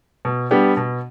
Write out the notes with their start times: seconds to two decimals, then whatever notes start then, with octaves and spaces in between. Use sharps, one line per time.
0.25 B2
0.51 G3 B3 D4 G4
0.77 B2